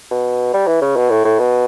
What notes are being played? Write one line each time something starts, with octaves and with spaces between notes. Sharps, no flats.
B2
G3
E3
C#3
B2
A2
A2
B2